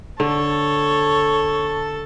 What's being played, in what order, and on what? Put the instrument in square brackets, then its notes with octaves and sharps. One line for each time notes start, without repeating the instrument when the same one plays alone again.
[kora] D3 [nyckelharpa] A4 A5 [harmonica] C#5